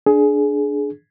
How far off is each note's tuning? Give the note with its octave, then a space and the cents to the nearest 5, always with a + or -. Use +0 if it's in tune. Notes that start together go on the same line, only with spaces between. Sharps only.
D4 +0 G#4 +20